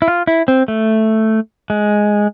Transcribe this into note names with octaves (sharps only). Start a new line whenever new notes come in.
E4
F4
E4
C4
A3
G#3